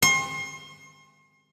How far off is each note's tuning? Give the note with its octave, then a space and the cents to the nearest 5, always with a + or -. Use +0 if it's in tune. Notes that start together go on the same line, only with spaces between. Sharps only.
C6 +35